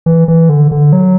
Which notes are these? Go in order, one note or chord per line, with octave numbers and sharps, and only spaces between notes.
E3
E3
D3
D3
F#3